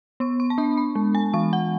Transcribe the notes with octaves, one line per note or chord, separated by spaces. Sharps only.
B3 C#6
C#6
A5
D4 B5
B5
G#3
G#5
E3 C#6
F#5